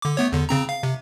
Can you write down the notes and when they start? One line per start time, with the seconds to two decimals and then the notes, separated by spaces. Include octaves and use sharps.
0.02 D3 D6
0.17 A3 B3 C#5
0.32 E2 D3
0.49 C#3 C4 A#5
0.69 F5
0.83 C3